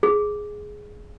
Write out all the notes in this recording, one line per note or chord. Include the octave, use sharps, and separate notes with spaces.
G#4